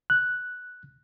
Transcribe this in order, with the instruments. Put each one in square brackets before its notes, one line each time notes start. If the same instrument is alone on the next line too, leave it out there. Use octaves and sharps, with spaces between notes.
[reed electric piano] F#6